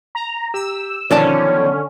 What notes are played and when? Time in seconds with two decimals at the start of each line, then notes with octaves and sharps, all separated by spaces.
0.15 A#5
0.54 G4 E6
1.11 B1 D3 D#3 F3 C#4 C#5 D5 A5